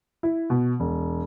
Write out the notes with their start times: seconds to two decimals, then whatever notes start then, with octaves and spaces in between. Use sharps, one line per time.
0.23 E4
0.50 B2
0.80 E1